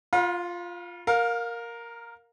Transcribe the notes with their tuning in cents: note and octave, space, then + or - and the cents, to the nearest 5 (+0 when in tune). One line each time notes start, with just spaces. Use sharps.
F4 +0 F5 +45 B5 -35
A#4 +0 F5 +25